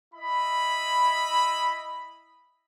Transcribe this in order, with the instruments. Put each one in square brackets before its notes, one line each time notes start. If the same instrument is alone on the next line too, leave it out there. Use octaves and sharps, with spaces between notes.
[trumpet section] E4 D#5 B5